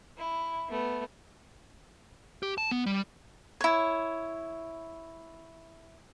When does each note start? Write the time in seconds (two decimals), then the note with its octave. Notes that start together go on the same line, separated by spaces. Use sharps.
0.17 E4
0.70 A3 B3
2.43 G4
2.58 A5
2.71 B3
2.86 G3
3.61 E4 C#5